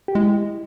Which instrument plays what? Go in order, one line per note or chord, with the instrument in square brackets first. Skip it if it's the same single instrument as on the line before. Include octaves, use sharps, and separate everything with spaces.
[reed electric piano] G4
[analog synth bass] G#3 [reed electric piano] E4